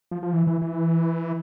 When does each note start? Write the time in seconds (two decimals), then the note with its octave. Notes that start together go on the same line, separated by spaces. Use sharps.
0.12 F3
0.23 F3
0.33 E3
0.47 E3
0.62 E3